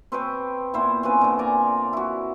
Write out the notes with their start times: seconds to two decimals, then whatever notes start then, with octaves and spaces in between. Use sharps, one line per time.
0.12 C4 B4 C#5 G5
0.74 A#2 B3 E4 C5
1.03 C4 C#4 F4 B4
1.21 A#2 D3
1.39 D5 G#5 A#5
1.93 E4 F#4